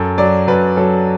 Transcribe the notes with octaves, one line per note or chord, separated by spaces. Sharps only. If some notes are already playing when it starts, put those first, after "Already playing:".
Already playing: F#2 A4
F#3 D5
F#2 B4
F#3 A4